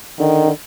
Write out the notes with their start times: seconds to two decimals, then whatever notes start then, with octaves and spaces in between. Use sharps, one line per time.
0.20 D3 D#3
0.47 D3